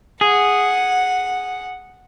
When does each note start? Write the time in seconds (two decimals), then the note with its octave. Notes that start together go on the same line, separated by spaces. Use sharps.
0.21 G#4 F#5